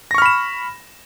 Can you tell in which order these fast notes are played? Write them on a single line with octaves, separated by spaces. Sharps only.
A#6 C#6 F6 B5 E7